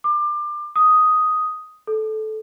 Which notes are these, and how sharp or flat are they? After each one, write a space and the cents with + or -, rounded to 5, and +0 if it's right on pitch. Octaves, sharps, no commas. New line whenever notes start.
D6 +25
D#6 +5
A4 -15